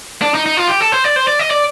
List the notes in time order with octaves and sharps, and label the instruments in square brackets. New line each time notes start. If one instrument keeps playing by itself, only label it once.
[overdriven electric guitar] D4
D#4
D#4
F4
G4
A4
C5
D5
C5
D5
D#5
D5